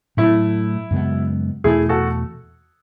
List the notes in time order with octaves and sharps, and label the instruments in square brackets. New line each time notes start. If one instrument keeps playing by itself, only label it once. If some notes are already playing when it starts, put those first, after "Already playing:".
[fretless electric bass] A2 F#3 A3 [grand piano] E4
[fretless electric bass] F#2 C#3 G#3 B3
[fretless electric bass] E2 B2 A3 [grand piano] E4 G#4
[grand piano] F#4 A4